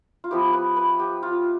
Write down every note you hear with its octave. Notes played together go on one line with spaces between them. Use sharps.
F4
F3 B3 E4 G4
B4
B4
G4
F4